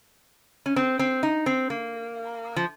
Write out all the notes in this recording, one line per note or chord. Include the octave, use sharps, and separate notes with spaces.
C#4
C4
C4
D#4
C4
A#3
F3